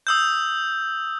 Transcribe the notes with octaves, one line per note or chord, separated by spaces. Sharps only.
D#6 E6 G6